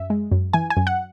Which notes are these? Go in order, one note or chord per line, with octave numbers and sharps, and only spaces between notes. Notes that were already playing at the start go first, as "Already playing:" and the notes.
Already playing: F#2 E5
G#3
F#2
E3 G#5
G#5
F#2
F#5